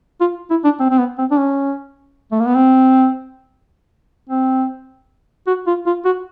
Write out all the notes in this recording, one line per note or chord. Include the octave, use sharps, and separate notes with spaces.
F4
E4
D4
C4
C4
B3
C4
D4
C#4
A3
A#3
B3
C4
C4
F#4
F4
F4
F#4